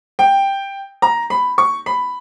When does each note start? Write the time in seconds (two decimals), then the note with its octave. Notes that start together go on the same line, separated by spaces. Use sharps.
0.19 G5
1.02 A#5
1.30 B5
1.58 C#6
1.86 B5